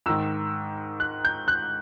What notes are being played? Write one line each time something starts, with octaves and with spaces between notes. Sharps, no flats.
G#2 D#3 E6
F#6
G6
F#6